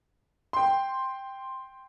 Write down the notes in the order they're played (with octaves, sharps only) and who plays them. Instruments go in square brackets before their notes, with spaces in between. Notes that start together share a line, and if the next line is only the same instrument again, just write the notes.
[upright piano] G5 C6